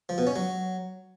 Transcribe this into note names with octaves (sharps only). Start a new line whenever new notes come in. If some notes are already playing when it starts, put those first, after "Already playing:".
F3
B2
C#4
F#3